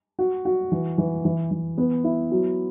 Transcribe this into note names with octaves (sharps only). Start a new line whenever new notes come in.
F#4
F#4
E3
E3
E3
E3
B3
E4
F#3